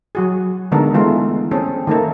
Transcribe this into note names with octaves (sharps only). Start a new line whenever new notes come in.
F#3 F#4 G#4
D3 D#3 G#3 B3 A4 A#4
E3 G#3 A3 B3 F4
C4 C#4 G#4 A4
D#3 A3 A#3 D#4 A4